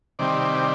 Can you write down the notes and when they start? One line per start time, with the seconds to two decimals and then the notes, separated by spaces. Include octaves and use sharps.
0.19 C3 D#3 G3 C4 D5